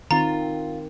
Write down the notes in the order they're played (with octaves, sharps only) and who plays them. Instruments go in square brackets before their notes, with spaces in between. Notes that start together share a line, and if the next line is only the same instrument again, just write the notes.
[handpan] D#3 C4 [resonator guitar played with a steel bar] F4 [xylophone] A#5